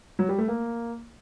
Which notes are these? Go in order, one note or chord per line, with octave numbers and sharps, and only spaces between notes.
F#3
G3
A3
A#3